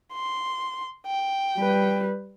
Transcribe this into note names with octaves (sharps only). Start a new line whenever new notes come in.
C6
G5
G3 B4